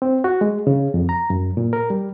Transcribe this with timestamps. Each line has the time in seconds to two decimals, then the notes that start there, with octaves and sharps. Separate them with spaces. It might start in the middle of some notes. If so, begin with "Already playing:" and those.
0.02 C4
0.24 F#4
0.41 G#3
0.67 C#3
0.94 F2
1.09 A#5
1.30 F#2
1.57 A#2
1.73 A#4
1.90 G3